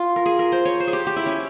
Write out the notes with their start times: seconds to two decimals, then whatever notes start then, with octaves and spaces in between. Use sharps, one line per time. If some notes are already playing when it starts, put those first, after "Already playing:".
Already playing: F4
0.16 A#4
0.26 G#4
0.39 A#4
0.52 C5
0.65 C#5
0.80 C5
0.87 G#4
0.93 G4
1.07 G4
1.16 E4
1.26 C#4